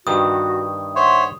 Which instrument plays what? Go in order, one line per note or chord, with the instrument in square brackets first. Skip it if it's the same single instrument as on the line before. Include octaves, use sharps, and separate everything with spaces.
[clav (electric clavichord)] G2 D#3 [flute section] F#4 [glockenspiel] D#6
[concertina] C5 C#5 [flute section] E5 F#5 C6